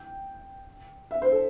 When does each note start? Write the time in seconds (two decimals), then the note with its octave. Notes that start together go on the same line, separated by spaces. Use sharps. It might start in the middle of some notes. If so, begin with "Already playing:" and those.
Already playing: G5
1.11 E5
1.22 C5
1.32 A4